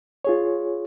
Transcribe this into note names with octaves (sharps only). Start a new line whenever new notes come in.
F4 G#4 C#5